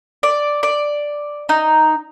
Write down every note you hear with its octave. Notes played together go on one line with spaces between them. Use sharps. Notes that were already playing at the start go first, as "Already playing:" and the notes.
D5
D5
D#4